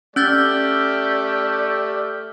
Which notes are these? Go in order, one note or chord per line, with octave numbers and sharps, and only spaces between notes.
A3 C#4 G4 D5 E6 F6 G6 A6